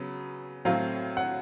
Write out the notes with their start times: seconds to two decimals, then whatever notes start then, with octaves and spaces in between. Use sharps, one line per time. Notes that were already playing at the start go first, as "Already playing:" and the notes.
Already playing: C#3 F#3 B3
0.65 A2 F#3 A3 C4 F5
1.17 F#5